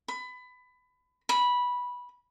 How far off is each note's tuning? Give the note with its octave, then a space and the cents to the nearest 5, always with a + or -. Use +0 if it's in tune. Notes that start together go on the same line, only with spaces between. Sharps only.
B5 +25
B5 -10